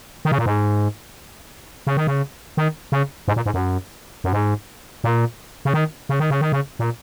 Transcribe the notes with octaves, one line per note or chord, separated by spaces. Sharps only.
D#3
C#3
A#2
G#2
C#3
D#3
C#3
D#3
C#3
G#2
A#2
G#2
F#2
F#2
G#2
A#2
C#3
D#3
C#3
D#3
C#3
D#3
C#3
A#2